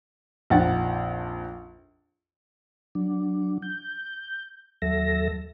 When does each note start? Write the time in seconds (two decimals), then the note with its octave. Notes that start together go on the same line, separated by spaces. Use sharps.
0.50 A#1 F2 D#4 F#5 A6
2.95 F#3 D4
3.62 G6
4.82 D#2 F#3 A4 E5 A#6